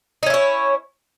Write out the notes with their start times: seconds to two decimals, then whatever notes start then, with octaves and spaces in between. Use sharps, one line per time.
0.23 D#4
0.26 C#4
0.30 E4
0.34 C#5